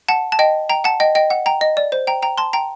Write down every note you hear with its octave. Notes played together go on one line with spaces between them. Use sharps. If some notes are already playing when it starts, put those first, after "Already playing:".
F#5 A5
A5
D#5 G5
G5 A#5
F#5 A5
D#5 G5
D#5 G5
F#5
G5 A#5
D#5
D5
C5
G5 A#5
G5 A#5
A5 C6
G5 A#5